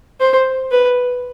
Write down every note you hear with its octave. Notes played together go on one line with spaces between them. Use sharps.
C5
B4